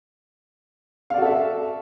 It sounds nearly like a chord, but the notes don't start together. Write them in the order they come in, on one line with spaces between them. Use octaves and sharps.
F5 D5 F#4 A4 E5